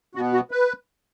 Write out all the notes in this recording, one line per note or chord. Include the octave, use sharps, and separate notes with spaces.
B2 B3 F#4
F#4
B4